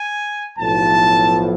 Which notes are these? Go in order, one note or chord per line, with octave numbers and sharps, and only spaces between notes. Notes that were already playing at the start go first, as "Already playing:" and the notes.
Already playing: G#5
B1 A2 F3 A5